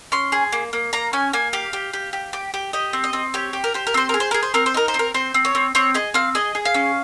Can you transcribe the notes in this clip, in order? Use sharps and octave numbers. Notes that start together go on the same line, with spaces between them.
C#4 C6
G#4
A#3
A#3
A#3 A#5
C#4 G#5
A#3 G#5
G4 F5
G4
G4
G4
G4
G4
G4 D#5
C4
D#5
C4
G4 C#5
G4
A#4
G4 C5
A#4
C4 C5
G#4 A#4
C5
G#4 A#4
C5
C4 A#4
C5
D#4 A#4
C5
C4
A#4
C4 C5
C4
C#5
C4
C4 C#5
G#4 D#5
C4 F5
G#4 D#5
G#4
F5
C#4